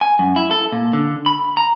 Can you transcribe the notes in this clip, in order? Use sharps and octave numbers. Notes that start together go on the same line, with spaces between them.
G#5
F#2
E4
A4
A#2
D3
B5
A#5